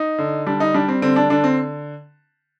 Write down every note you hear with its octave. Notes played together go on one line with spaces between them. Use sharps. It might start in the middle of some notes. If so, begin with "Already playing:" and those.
Already playing: D#4
D3
G3 D4
D#4
G3 D4
C4
D3 C4
D4
D3 D4
C4